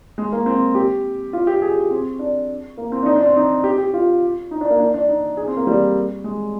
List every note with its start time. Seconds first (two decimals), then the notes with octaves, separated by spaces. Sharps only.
0.18 G#3
0.32 A#3
0.46 C4
0.75 G4
1.33 F4
1.47 G4
1.62 G#4
1.76 G4
1.90 C4
2.19 D4
2.77 A#3
2.92 C4
3.03 D4
3.06 D#4
3.16 D4
3.26 C4
3.36 D#4
3.64 G4
3.78 G4
3.94 F4
4.51 D#4
4.61 D4
4.70 A#3
4.80 D4
4.94 D4
5.08 D#4
5.37 G#4
5.48 C4
5.57 A#3
5.67 G3
6.24 G#3